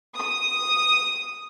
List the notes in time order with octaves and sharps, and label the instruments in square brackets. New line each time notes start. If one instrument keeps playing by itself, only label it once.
[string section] D#6